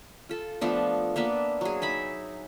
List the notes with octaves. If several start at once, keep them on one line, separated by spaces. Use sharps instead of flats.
F4 A4
F3 A3 B3 D4
A#3 B3 D4 E5
F#3 G#4
D#4 E5 B5